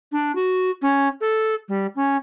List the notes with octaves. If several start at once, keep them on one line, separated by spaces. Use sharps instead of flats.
D4
F#4
C#4
A4
G3
C#4